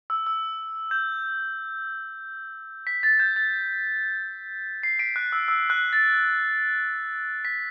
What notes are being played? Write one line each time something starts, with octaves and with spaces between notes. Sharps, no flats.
E6
E6
G6
B6
A6
G6
A6
C7
B6 D7
F#6
E6
E6
F#6
A6
B6